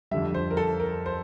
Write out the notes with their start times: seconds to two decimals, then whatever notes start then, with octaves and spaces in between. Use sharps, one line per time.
0.11 F2 D3 G3 E5
0.34 C5
0.51 A#4
0.57 A4
0.80 A#4
1.06 C5